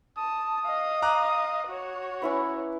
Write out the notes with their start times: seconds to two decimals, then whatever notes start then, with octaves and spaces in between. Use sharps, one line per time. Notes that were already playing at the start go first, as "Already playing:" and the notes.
0.18 A5 D#6
0.66 D#5 F5
1.02 A#5 D6 F#6
1.68 F#4 C#5
2.22 C#4 E4 B4